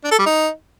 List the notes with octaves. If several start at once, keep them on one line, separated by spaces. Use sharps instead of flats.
D4
A4
G3
D#4